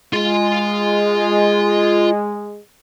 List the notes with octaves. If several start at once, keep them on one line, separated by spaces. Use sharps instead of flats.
G#3 F4 C6